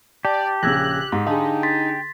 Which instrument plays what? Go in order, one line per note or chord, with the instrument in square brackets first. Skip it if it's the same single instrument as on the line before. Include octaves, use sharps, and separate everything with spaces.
[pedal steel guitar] G4 [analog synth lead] D5 [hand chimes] A5
[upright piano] A#1 C#3 [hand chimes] E6 G#6 A#6 [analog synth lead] F#6
[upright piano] G#2 [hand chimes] C6
[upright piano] D3 G#4 [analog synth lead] D#4 [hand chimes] F5 A5
[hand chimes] C6 A6 B6